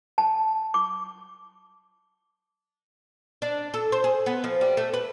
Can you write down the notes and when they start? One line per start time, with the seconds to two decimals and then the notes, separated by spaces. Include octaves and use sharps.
0.18 A5
0.74 D6
3.42 D4
3.74 A4
3.92 C5
4.04 G#4
4.26 B3
4.44 F3
4.61 G3
4.77 A3
4.94 B4